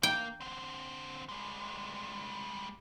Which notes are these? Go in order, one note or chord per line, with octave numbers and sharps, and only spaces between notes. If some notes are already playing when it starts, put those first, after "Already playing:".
A#3 G5
D3 C4
G3 G#3